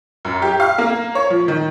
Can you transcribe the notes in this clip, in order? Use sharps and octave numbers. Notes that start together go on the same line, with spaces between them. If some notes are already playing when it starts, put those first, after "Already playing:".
F#2
G4
F5
A#3
C#5
F3
D#3